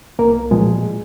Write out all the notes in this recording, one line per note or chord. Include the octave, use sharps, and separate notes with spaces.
C2 A#3 A#4
A#2 F3 G#3 G#4